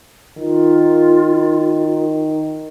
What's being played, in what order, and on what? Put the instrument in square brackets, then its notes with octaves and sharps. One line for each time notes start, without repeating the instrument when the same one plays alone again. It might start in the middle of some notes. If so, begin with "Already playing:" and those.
[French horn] D#3 [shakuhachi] F4